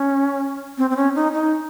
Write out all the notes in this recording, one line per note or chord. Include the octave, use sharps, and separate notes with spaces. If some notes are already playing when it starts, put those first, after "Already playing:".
Already playing: C#4
C4
C4
C#4
D#4
D#4